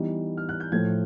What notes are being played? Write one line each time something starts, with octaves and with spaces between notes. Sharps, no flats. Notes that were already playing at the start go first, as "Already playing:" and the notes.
Already playing: E3 G3 B3 D#4
F6
F#6
G6
A2 F3 A3 G#6